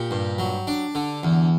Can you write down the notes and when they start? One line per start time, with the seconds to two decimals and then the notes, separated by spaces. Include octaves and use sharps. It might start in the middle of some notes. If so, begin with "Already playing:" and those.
Already playing: A#2 G4
0.11 G2
0.39 F#3
0.67 D4
0.95 D3
1.23 E2